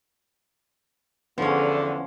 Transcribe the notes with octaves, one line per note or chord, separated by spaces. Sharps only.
E2 D3 F3 B3 C#4